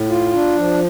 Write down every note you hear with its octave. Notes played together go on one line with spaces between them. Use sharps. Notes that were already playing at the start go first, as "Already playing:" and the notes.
Already playing: A2
F4
D4
F3